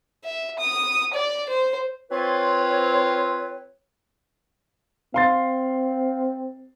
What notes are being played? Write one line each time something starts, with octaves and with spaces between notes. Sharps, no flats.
E5
D#6
D5
C5
C4 F4 B4 C#5
C4 F5 C6 A6